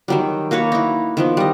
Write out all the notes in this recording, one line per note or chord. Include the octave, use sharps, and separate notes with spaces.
D#3 F#3 G3
A#3 F#4 B4 C#5
D#4 E4
D#3 F3 B3
G3 D#5